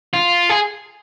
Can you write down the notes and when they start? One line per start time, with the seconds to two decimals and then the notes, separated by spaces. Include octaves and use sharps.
0.14 F4
0.50 G#4